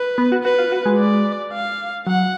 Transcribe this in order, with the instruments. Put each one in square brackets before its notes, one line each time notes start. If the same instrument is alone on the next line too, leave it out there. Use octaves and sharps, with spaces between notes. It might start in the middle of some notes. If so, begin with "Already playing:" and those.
Already playing: [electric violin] B4
[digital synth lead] B3
F#4
[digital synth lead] F#4 [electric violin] B4
[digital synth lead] F4
F#4
G#3
[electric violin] D5
F5
[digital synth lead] F#3 [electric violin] F#5